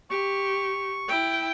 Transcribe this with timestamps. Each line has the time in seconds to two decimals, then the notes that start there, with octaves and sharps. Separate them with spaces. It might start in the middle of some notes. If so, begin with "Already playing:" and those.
0.10 G4 C#6
1.08 E4 G5